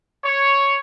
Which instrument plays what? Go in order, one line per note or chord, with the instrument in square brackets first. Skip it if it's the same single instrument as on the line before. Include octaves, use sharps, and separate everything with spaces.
[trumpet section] C#5